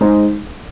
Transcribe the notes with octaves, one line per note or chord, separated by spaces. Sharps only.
G#3 D#4 G#4 C5